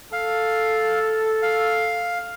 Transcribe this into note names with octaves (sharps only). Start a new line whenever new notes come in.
A4 F5
F5